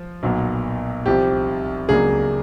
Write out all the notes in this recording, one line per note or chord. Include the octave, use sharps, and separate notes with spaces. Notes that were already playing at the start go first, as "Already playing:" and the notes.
Already playing: F3
B1 A#2 F#3 B3
C2 C3 F3 G4
C#2 C#3 F#3 A#3 D4 G#4